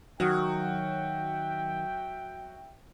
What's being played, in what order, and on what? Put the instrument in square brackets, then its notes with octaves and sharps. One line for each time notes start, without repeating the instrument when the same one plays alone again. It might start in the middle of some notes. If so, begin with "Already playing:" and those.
[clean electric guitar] D#3 [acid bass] F#3 [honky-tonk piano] F#4 [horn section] E5 G5